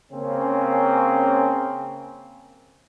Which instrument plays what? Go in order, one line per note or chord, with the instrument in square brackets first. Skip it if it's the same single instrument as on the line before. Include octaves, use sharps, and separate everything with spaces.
[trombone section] C#3 A#3 C4 C#4